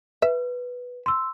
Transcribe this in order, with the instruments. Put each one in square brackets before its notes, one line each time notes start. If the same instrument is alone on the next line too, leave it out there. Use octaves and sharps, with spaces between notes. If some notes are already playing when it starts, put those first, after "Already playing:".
[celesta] B4 [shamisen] E5
[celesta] C6 E6